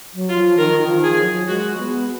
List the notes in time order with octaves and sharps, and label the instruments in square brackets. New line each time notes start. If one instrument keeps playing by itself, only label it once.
[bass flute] F#3
[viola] F4
[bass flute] F3
[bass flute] D#3 [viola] A#4
[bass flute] F3
[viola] G#4
[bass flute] F#3
[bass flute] G#3 [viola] F#4
[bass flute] B3